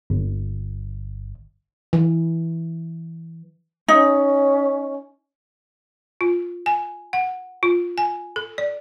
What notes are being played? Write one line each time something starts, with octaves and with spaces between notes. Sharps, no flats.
G1
E3
C#4 D#4
F4
G#5
F#5
F4
G#5
A4
D5